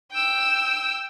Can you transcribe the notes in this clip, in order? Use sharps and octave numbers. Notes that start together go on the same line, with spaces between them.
G5 E6